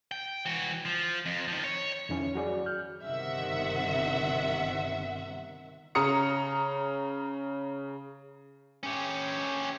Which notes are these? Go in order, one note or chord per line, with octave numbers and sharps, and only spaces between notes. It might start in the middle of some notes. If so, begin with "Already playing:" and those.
G5
E3 F#4
F3
F2
D#3 F3
C#5
F2 D#3 C#4 E4
F#3 F#4 G#4 D5
F6 G6
G1 C3 D#3 E5 F#5
C#3 A#5 D#6 C#7
C#4 G4